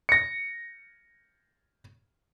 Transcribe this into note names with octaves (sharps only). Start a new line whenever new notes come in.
A#6 C#7